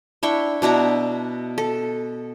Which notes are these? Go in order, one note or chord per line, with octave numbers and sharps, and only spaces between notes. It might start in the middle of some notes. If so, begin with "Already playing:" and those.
D4 E4 G5 C#6
B2 D4 E4 A#5
A4